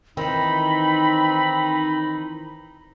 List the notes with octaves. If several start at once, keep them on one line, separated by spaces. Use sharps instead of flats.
D#3 E3 C4 D#4 B5